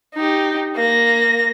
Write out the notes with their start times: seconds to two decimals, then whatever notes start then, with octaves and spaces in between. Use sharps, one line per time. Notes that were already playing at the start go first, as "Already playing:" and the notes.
0.15 D#4 G4
0.76 A#3 A#6